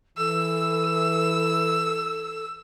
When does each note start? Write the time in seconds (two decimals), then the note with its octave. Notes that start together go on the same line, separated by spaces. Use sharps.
0.18 E3 A4 E6